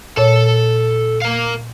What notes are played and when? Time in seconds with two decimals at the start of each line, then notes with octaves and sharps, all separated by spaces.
0.17 A#2 A4 C#5 A5
1.22 A#4 F5